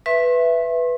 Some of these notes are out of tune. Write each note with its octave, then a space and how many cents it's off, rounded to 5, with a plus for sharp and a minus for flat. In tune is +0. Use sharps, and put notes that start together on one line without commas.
B4 +0 E5 +10 C6 +45